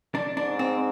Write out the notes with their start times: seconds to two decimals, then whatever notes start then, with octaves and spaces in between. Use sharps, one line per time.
0.15 D4
0.36 G#2 D4
0.59 C4